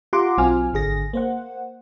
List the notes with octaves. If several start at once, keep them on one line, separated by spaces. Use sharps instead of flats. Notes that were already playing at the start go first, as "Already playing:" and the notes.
F4 G4 F#5 A#5 C6 D6
B1 F#3 C4 F4 G#5 F6
G#1 D3 G#4 A#6
A#3 C5 F#5